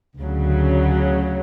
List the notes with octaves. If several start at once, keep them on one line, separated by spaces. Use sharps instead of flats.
D2 C#3 F#3